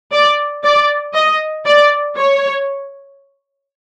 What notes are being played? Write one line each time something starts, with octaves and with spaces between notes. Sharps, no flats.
D5
D5
D#5
D5
C#5